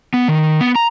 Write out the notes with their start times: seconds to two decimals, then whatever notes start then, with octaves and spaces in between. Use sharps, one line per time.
0.14 B3
0.28 D#3
0.61 B3
0.76 A#5